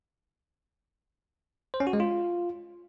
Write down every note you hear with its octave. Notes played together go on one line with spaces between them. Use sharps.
C5
C#4
F#4
G#3
F4